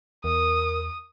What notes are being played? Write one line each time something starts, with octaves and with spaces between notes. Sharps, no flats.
E2 A#4 D#6